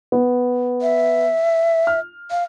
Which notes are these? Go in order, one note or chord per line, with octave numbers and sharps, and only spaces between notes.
B3
E5
F6
F5